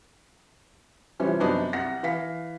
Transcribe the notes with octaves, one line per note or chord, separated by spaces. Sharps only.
C3 E3 F3 G3 C4 C#4
F#2 C3 B3 D4 D#4 F#4
C2 F#5 A#6
E3 F5 B6